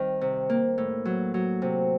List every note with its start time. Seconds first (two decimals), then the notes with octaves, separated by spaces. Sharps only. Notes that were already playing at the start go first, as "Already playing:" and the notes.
Already playing: D#3 G3 C4
0.21 C3
0.50 A#3
0.78 A2
1.05 F#3
1.34 F#3
1.62 C3